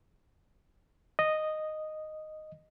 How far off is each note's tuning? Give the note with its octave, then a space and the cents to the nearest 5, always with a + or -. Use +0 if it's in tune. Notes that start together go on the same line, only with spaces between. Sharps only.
D#5 -5